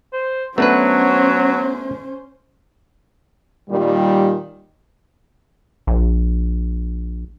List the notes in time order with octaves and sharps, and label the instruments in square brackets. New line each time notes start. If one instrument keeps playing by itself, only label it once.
[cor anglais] C5
[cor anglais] F#3 [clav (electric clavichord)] A3 D4 B4 [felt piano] B3 [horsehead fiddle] C#4 C5
[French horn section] A#2 D#3 G3
[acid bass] A#1